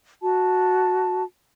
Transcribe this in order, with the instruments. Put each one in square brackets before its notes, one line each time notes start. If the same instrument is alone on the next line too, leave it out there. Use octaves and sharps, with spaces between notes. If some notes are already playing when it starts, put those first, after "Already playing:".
[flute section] F#4 A5